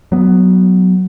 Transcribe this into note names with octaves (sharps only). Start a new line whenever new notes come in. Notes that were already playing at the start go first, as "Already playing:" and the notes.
F#3 B3